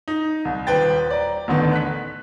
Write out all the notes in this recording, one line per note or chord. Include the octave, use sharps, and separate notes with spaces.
D#4
C2
D#1 B4 C5 G5 A6
D5 A#5
A1 D2 D3 D#3 B3
F#6 B6